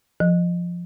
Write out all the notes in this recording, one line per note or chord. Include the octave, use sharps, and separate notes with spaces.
F3